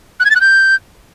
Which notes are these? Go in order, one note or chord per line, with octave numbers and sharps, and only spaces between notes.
F#6
G#6
A6
F#6
G6